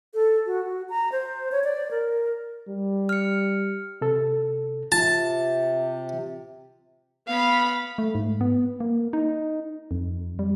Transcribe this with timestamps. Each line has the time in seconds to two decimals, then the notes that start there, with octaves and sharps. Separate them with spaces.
0.14 A4
0.46 F#4
0.65 F#4
0.89 A#5
1.12 C5
1.52 C#5
1.64 D5
1.91 A#4
2.69 G3
3.09 F6 C#7
4.01 C3 A4
4.92 C3 F4 A5
7.28 B3 F5 B5
7.98 A3
8.15 G#2
8.41 B3
8.80 A#3
9.13 D#4
9.91 F2
10.39 G3